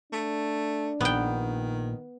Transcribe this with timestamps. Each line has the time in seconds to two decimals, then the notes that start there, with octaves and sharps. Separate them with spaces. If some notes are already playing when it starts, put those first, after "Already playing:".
0.13 A3 D4
1.01 A#1 D#3 B3 G5